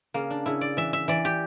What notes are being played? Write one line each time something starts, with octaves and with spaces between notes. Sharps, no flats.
C#3 A#3
D4
C#3 E4
D5
E3 E5
E5
E3 D5
G4